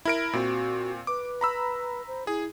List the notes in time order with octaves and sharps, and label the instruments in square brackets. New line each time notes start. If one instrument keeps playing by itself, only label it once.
[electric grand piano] E4 A#4 D7
[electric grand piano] A#2 C4 [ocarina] F#4
[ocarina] B4 [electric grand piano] D6
[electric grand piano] A#5 B5 E6
[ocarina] C5
[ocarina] E4 [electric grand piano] G#4